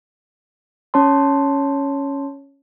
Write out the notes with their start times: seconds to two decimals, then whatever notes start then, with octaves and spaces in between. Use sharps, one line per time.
0.94 C#4 C#5 A5 C6